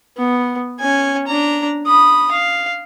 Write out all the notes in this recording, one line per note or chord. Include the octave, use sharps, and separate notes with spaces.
B3
C#4 G#5
D4 A#5
B5 D#6
F5